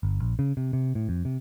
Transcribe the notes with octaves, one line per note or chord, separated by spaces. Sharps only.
G1
A#1
C#3
C3
C3
A2
F2
C3